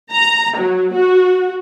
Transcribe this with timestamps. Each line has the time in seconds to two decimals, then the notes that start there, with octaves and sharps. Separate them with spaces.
0.12 A#5
0.58 F#3
0.94 F#4